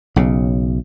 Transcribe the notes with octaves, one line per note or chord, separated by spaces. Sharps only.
B1 C#3